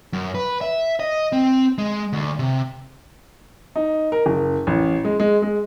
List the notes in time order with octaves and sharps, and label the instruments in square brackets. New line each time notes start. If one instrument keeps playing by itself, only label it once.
[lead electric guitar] F#2
B4
E5
D#5
C4
G#3
D2
C3
[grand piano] D#4
A#4
F#1
A1
G#3
G#3
G#3